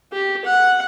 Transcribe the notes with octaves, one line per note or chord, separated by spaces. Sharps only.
G4
F#5